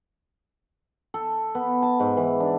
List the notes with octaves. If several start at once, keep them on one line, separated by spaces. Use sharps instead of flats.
A4
B3
A5
G#2
E3
D4